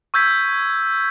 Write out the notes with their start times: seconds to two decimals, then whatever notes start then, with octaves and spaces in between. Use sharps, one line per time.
0.14 C#6 E6 G6 G#6 B6